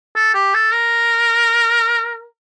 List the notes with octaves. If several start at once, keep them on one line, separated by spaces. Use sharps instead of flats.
A4
G4
A4
A#4